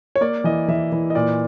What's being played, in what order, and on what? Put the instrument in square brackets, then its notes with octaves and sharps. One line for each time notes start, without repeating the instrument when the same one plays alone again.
[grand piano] C#5
A#3 D5
E3 D#5
E3 E5
E3
D#5
A#2 D5